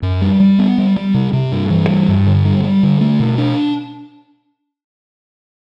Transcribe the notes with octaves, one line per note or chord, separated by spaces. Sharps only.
F#2
G3
G3
B3
G3
G3
C3
C3
G2
E3
G3
G2
D3
G3
G3
D3
A3
B2
D4